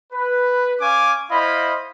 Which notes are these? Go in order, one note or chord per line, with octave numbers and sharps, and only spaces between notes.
B4
C#4 F5 G#5 C#6 D6
E4 C5 D#5 F5 B5